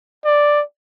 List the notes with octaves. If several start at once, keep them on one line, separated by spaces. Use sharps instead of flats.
D5